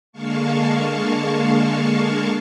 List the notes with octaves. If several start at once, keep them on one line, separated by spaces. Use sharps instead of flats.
D3 G#3 A#3 F5 A5 C#6